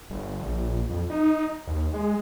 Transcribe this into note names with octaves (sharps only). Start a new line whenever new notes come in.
G1
A#1
F2
D#4
D#2
G#3